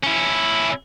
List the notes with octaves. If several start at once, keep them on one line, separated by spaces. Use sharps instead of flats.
C#4 E4